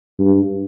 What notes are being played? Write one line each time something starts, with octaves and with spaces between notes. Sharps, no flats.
G2